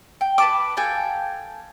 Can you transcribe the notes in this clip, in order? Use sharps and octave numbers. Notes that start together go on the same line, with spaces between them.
G5
B4 A5 D6
A4 F5 G5 G#5